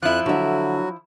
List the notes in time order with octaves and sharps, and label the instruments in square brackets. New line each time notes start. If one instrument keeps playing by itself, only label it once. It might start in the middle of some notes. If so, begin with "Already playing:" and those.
[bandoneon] F2 F#6 [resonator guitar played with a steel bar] F3 E4
[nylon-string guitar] D3 E5 [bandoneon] F#3 F#4